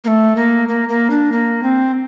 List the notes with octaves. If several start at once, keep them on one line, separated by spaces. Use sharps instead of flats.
A#3
A3
A#3
A#3
A#3
D4
A#3
C4